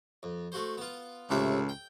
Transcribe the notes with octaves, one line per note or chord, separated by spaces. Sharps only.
F2
A3 F#4 C5
B3 F4
C#2 A2 C3 E5
G5